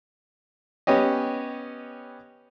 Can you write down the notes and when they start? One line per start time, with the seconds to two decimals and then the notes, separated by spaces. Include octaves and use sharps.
0.87 B3 C#4 G4 D#5